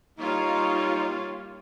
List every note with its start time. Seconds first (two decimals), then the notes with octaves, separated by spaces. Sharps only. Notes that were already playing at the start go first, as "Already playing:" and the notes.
0.19 G3 A#3 D#4 F4 C#5 F5 C#6